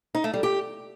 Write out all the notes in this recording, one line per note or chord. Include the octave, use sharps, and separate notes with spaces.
D#4
A3
G3
G4